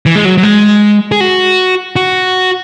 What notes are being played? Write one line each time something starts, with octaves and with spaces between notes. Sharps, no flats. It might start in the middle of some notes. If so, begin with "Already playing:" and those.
E3
G#3
F#3
F#3
G#3
G#4
F#4
F#4